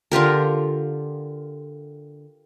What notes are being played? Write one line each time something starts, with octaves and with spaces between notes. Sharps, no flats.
D3 F4 G4 A#4